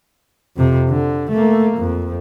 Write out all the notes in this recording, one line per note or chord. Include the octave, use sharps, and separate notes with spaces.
F2 C3
D3
A3 A#3
F2